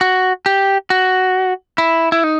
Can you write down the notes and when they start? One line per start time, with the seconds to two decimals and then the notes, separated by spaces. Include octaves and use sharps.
0.01 F#4
0.46 G4
0.90 F#4
1.78 E4
2.12 E4
2.24 D#4